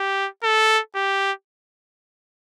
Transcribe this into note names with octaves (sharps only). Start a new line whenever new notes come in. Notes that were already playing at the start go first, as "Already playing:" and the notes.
Already playing: G4
A4
G4